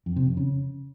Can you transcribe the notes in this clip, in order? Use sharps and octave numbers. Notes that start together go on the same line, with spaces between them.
F2
C3
F2
C#3